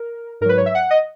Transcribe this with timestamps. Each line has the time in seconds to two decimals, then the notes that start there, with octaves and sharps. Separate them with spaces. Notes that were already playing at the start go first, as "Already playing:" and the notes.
Already playing: A#4
0.41 G#2 A#4
0.45 F#3 B4
0.57 C#5
0.66 E5
0.75 F#5
0.90 D#5